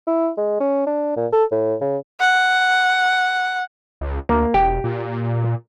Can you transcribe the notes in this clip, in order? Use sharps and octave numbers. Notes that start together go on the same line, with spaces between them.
E4
G#3
C#4
D4
A#2
A4
A2
C#3
F#5
C#2
D2 A#3
E1 G4
A#2